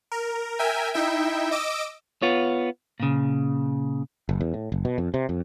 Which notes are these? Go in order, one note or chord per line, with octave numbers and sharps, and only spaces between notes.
A#4
A#4 E5 G5 G#5
D#4 E4 E5 G5
D#5 D6 E6 D7
B3 F4 C#5
A#2 C#3
F#1
E2
A2
F#1
B2
F2
C3
F2